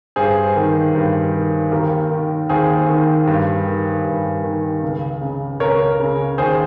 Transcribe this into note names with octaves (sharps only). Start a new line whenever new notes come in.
G2 G#4 C5
D#3
G2
D#3
D#2 G4 A#4
D#3
D#2 G#4 C5
D#3
G2
D#3
G2
D#3
C#2
C#3
C#2 A#4 C#5
C#3
D#2 G#4 C5